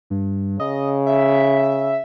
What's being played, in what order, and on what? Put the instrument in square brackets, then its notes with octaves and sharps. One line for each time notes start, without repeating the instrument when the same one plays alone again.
[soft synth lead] G2
[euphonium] C#3 [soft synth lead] D#5
[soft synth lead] E5